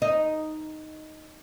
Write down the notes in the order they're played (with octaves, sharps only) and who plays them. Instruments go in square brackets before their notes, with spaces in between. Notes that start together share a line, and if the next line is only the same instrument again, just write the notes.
[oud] D#4